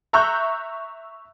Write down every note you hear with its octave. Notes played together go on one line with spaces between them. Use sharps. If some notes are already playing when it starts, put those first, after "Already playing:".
E5 A#5 C#6 E6 F#6 G6